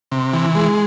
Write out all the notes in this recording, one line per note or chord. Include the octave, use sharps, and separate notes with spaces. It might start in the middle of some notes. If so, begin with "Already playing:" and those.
C3
E3
G#3